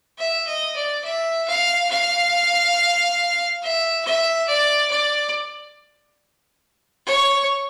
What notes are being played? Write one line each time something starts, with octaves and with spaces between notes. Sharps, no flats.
E5
D#5
D5
E5
F5
F5
E5
E5
D5
D5
C#5